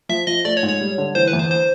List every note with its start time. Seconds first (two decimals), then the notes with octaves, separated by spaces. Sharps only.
0.09 F3 E5
0.27 F3 D#5
0.45 A3 D5
0.57 C#5
0.63 G#2
0.68 C#5
0.81 G3
0.98 D3
1.15 E3 C5
1.28 B4
1.33 E2
1.39 C5
1.51 C5